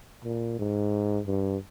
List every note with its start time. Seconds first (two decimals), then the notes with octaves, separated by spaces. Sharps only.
0.24 A#2
0.59 G#2
1.26 G2